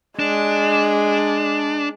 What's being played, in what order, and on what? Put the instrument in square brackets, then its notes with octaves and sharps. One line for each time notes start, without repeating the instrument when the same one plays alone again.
[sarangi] G#3 [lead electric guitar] D4